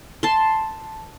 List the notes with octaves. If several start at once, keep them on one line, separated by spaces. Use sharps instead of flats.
A5 C6